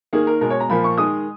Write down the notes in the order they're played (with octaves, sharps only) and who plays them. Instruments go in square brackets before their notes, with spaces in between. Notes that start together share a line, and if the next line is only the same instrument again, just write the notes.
[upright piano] D#3 A#3 G#4
A#4
B2 G#3 A#4
C#5
A#5
A#2 F3 A#3 B5
C#6
D#3 G#3 D#6